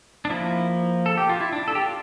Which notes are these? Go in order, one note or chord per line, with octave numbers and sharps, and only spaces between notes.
D4
F3 A#3 E4
A4
G4
F4
E4
D4
A4
G4
D4 F4